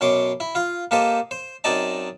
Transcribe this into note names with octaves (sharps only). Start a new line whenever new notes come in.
F#2 B2 C#5 C6 D6
E4
F4 F5
A#3 G4 A4 C5 D#5
C5
F#2 C4 D#4 D5 D#5 A5